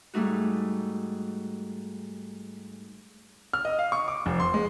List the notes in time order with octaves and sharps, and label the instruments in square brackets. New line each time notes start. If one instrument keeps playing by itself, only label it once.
[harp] G#2 G3 A3 D#4 F#4
[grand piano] F6
D#5
F5
C#6
D6
F1
C6
G#3